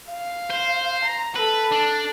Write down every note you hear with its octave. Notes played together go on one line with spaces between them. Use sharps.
F5
C5
A#5
A4 B4
D4